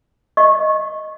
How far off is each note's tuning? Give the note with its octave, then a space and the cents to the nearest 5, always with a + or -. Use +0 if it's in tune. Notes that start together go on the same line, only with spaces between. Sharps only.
D#5 +0 C#6 -20